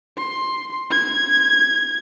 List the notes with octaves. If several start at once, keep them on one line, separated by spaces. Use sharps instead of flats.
C6
G#6